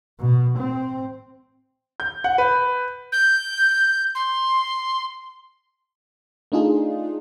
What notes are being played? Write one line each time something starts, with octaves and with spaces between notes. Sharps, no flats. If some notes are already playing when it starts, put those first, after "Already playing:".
B2
C4
G6
F#5
B4
G6
C6
A3 D4 D#4 F4 G#4